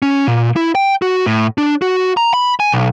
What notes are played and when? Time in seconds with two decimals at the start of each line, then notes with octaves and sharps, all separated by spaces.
0.02 C#4
0.28 A#2
0.56 E4
0.75 G5
1.02 F#4
1.27 A2
1.58 D4
1.82 F#4
2.17 A#5
2.34 B5
2.60 G#5
2.72 B1